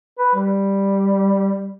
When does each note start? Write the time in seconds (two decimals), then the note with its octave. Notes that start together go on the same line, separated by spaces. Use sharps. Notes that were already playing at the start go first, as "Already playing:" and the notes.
0.19 B4
0.35 G3